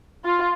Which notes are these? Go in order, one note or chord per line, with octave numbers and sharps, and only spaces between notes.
F4